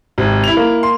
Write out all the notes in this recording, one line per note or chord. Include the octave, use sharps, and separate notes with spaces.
G#1 C3
E4 F7
A#3
C6